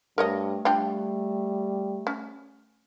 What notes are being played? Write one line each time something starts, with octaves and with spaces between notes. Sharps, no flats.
G2 A3 A#4 C#5 D#5
G3 D4 F4 G5
C#4